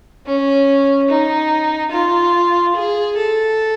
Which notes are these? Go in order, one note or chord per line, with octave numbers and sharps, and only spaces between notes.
C#4
D#4
F4
G#4
A4